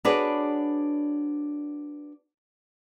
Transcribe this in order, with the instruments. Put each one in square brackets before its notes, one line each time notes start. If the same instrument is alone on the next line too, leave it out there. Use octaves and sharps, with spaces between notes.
[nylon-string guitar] D4 F#4 G#4 B4 C#5 D5